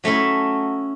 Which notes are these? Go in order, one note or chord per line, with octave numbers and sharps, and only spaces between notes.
F#3 A3 C#4 E4